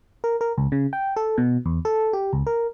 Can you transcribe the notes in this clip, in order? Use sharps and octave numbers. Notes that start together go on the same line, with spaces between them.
A#4
A#4
C#2
C#3
G5
A4
B2
E2
A4
G4
C#2
A#4